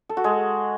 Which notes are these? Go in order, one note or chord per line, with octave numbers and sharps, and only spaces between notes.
A4
F#4
G#3